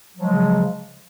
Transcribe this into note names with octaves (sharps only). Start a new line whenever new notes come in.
C#3 F3 F#3 G#3